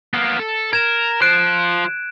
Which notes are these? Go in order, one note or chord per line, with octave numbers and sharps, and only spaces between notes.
A#3 B3
A4
A#4 G#6 E7
F3 C5 F#6 D7